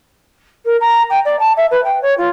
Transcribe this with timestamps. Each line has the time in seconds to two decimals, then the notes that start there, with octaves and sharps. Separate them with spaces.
0.65 A#4
0.80 A#5
1.10 G5
1.25 D5
1.39 A5
1.57 E5
1.71 B4
1.84 G5
2.02 C#5
2.17 F4